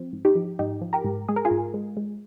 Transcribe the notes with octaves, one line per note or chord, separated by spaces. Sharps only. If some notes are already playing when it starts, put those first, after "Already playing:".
Already playing: F3 C4
G#2
D#4 G4
F3
G#2 D#4 G4
F3
G4 A#4
G#2
G#3 G#4
A#4
F4 G#4
G#2
G#3
G#3